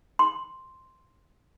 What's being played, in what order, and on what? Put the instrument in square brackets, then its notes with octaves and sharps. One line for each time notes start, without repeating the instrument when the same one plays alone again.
[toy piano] C6